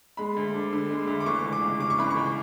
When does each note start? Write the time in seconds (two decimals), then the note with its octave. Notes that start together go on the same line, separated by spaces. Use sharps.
0.17 G#3 B5
0.37 D2
0.54 D4
0.73 D3
0.90 G#3
1.07 D2
1.20 D6
1.26 E3 C#6
1.44 C#2
1.52 D6
1.62 C#2
1.80 C#3 D6
1.90 C#6
1.99 E3 B5
2.10 C#6
2.17 C#2